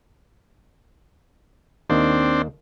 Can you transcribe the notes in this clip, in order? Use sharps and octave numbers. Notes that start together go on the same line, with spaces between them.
D#2 D#3 C4 D4